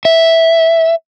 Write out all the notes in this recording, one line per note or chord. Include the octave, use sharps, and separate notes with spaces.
E5